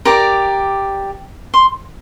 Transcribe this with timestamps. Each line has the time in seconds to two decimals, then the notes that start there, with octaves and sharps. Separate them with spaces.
0.05 G4 A#4 D5 A#5
1.54 C6